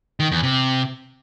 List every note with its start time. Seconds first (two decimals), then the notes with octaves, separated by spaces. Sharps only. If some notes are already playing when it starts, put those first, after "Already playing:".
0.20 D#3
0.31 E2
0.43 C3